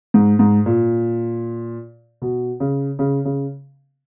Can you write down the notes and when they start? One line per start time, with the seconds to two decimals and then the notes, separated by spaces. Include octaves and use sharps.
0.14 G#2
0.39 G#2
0.66 A#2
2.22 B2
2.60 C#3
2.99 C#3
3.25 C#3